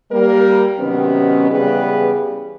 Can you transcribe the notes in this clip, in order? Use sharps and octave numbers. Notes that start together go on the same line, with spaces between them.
G3 A#3 A#4
C3 D#3 F#3 B3 C#4
C#3 E3 G3 B3 G#4 B4